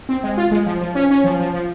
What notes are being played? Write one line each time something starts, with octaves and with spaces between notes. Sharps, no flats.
C4
G#3
F4
G#3
F3
F3
C#4
C#4
F3
F3
F3